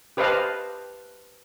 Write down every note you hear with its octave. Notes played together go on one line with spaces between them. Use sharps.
G4 B4 C5 D#5 F5 A5